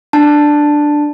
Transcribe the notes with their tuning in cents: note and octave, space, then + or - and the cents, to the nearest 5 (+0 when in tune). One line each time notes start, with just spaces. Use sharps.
D4 +5 A5 +0